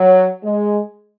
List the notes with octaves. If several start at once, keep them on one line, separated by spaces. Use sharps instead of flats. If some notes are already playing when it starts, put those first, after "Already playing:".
Already playing: F#3
G#3